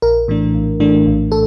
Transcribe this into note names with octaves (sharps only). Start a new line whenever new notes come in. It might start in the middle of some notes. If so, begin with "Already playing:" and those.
A#1 A#4
A2 E3 A3 D4
A#1
A2 E3 A3 D4
A#1
A2 A4